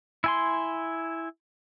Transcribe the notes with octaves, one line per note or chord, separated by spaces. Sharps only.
E4 G#5 C6